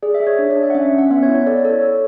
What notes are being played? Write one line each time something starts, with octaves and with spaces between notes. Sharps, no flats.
G#4 D5
E5
G#4
C#5
D4 C#5
D5
D4
E5
F#5
C#4 E5
E5
C#4
F#5
B3 E5
C#5
E4
C#5
A4 D5
C#5
A4
C#5
A4